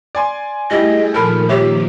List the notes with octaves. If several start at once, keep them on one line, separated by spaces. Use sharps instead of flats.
D5 G#5 C6
G3 A3 E4 G4 G#4 D#5
A#2 D#3 F3 A4 A#4 B5
G3 G4 C#5 E5